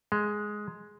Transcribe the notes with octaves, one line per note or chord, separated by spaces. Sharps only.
G#3